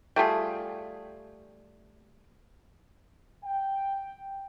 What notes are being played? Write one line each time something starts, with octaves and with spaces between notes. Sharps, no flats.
G3 A3 F4 G#4
G5